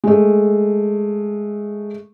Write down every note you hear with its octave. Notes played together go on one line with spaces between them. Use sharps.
G#3 A3